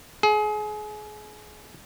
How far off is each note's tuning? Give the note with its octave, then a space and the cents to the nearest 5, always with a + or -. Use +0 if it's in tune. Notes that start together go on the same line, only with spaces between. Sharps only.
G#4 +30